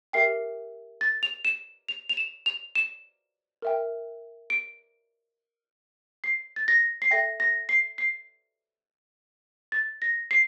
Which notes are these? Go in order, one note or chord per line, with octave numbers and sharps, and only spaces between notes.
G4 A#4 E5 G5 C7
A6
F7
E7
F7
F7
E7
F7
E7
A#4 E5 G5
D7
C7
A6
A#6
C7
A4 E5 G5 A#6
A#6
C7
C7
A6
A#6
C7